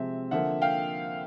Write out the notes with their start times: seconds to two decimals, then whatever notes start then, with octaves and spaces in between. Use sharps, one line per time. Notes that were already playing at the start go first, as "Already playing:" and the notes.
Already playing: C3 F3 G#3 C4 E5
0.31 D3 F3 A#3 E5 F#5
0.62 F5 G5